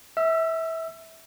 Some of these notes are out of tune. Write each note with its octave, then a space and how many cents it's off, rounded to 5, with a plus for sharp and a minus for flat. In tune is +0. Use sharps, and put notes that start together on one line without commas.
E5 -20 E6 +35